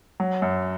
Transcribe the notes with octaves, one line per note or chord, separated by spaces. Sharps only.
F#3
F#2